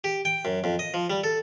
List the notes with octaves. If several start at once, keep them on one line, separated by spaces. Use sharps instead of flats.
G4
G5
F#2
F2
D#5
F3
G3
A4